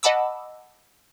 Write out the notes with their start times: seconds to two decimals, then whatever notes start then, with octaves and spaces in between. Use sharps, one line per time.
0.03 D#5 F#5 A5 B5 D6 E6